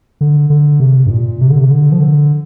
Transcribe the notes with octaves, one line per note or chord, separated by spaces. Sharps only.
D3
D3
C3
G2
A#2
C3
D3
C3
D3
F3
D3